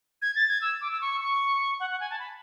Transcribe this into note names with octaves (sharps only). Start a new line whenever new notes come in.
G#6
A6
G#6
E6
D6
E6
C#6
C#6
F#5
F#5
G#5
A5
B5